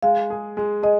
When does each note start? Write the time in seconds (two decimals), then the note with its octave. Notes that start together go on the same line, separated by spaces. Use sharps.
0.03 G#3 F5
0.30 G#4
0.57 G#3
0.83 G#4 D#5